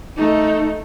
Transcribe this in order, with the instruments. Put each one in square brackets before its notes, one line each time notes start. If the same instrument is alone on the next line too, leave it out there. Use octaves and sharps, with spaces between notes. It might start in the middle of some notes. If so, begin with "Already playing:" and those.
[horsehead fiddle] A3 D#4